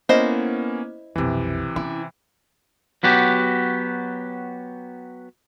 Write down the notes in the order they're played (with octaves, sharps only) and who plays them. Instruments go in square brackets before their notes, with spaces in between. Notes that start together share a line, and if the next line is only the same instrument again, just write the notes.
[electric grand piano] A#3 B3 C#4 [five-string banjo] E4 C5 D#5
[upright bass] B1 F2 [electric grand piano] C3 E3
[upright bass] C#4 [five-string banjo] E4
[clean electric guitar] F#3 B3 F#4 G4